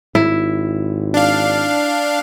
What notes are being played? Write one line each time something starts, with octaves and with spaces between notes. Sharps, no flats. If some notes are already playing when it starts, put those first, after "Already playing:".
G#1 E4
D4 F5